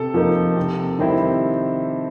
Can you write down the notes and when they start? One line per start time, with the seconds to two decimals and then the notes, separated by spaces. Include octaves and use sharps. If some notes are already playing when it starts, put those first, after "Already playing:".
Already playing: C3 A4
0.14 F3 A#3 D#4
0.57 C3
0.99 D#3 G3 C4 E4